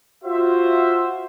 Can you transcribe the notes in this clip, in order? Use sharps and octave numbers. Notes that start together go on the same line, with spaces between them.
F4 F#4 C5 E5